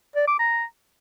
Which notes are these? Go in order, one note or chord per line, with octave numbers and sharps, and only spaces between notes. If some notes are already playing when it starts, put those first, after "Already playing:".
D5
D6
A#5